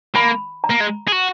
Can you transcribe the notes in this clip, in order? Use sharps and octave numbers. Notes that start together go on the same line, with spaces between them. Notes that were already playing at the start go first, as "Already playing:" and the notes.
A#3 B5
A#5
A#3
G#3
G#4
F#4